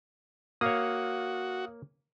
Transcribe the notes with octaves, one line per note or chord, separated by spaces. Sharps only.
A#3 F#4 C#5 F5 D#6